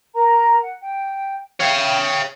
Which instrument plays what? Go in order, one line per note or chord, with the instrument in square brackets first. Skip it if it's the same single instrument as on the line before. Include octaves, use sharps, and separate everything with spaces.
[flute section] A#4 A#5
F#5
G5
[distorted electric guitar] C#5 F5 [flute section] E5 G5